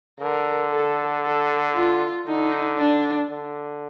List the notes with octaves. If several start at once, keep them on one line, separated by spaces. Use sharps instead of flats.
D3 A#4
A4
A4
F4
D3 D#4
D4
D3